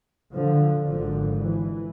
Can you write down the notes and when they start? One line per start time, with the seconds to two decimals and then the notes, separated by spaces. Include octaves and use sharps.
0.35 D3 F3
0.87 G#1 G#2 D3 F3
1.39 E3